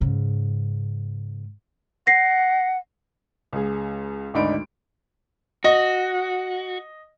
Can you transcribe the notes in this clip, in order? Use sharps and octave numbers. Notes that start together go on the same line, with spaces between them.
G#2 C#3
F#5 A#6 C7
C#2 G#4
G#1 D2 D4 D#4 B5 D7
F#4 D#5